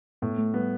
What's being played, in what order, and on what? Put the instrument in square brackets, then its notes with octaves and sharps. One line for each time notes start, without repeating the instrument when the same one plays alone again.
[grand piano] A2 [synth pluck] B3
[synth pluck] A3
[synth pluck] G3 [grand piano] B3